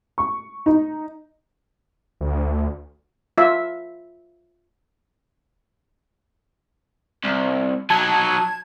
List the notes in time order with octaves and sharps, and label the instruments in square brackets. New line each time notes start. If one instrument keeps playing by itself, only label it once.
[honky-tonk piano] C#6
D#4
[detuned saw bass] D2
[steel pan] F4 E5
[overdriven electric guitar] C2
[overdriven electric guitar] F#3 D#4 [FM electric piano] A5 G#6